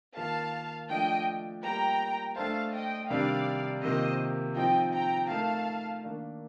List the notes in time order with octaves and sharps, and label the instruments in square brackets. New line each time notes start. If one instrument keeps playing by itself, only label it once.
[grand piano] D#3 A#3 F4 [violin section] F5 A5
[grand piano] F3 A3 D4 [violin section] D#5 G5
[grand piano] G3 A#3 F4 [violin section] G5 A#5
[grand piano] A3 D4 A4 C5 [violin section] F5 A5
[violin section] D#5 G5
[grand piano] C3 D#3 G3 D4 [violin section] D5 F5
[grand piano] C3 D#3 A#3 F4 [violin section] C5 D#5
[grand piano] F3 C4 D#4 [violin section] D#5 G5
[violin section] G5 A#5
[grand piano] A3 D#4 A#4 [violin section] F5 A5
[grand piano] D#3 A#3 D4